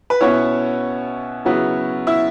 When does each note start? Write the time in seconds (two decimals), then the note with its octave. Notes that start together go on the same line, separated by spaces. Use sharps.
0.10 B4
0.21 B2 B3 C#4 E4 C#5
1.45 C#3 F#3 B3 E4
2.07 E4 E5